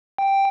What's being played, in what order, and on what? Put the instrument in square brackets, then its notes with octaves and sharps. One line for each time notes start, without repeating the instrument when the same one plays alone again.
[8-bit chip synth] G5